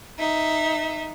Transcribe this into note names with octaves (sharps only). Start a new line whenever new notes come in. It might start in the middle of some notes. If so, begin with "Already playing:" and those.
D#4 E5